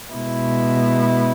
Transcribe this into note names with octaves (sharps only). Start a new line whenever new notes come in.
B2 G#3 B3 E4